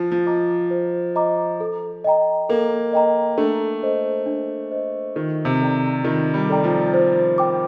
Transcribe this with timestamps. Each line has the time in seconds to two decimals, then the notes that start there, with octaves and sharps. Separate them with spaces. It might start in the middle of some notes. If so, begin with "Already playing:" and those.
Already playing: F3 C5
0.12 F3
0.26 D#5 A#5 D6
0.71 C5
1.16 D#5 A#5 D6
1.60 A4
2.05 D#5 G5 A#5
2.49 A#3 A4
2.93 D#5 G5 A#5
3.38 A3 D4
3.82 A4 C5 D#5
4.26 D4
4.71 A4 C5 D#5
5.16 D#3 F4
5.45 C3
5.60 A4 D5 G5 A#5
6.04 D#3 F4
6.34 G3
6.49 A4 D5 G5 A#5
6.64 F3
6.94 C5
7.38 G5 D6